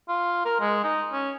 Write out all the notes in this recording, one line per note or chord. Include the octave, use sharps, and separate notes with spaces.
F4
A#4
G#3
D#4
C#4